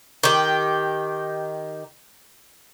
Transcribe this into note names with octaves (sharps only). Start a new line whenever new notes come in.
D#3 G4